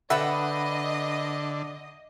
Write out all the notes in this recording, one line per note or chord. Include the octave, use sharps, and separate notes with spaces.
D3 A4 B4 D#5 E5 F#5 G5 B5